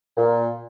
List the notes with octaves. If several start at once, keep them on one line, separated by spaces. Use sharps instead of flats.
A#2